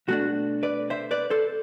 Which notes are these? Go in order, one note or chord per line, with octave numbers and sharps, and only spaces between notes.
B2 A3 D4 F#4
B4 D5
C5 E5
B4 D5
A4 C5